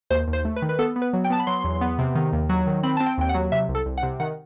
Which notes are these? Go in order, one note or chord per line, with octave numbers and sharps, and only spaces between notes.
D#2 C5
D#2
C5
A3
B4
D#3
B4
B3 A4
B3
B4
F#3
G5
B3 A5
B5
F#3 C6
E2
B3
C3
D#3
D#2
F#3
D#3
C4 B5
C4 A5
G5
D#2 G5
F#5
F#3
C3 E5
C2
A4
C2
F#5
C3
D#3 F#5